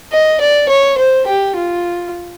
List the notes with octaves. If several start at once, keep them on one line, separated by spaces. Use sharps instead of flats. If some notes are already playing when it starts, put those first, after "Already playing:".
D#5
D5
C#5
C5
G4
F4